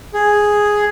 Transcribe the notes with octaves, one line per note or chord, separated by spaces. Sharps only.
G#4